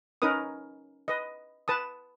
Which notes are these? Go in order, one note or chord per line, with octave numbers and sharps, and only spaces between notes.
C#4 D#4 A#4 B4 D#6
B4 D#5
B4 A5 D#6